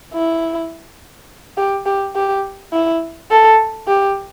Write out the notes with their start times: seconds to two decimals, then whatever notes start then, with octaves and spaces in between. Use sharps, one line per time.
0.13 E4
1.57 G4
1.86 G4
2.15 G4
2.73 E4
3.31 A4
3.88 G4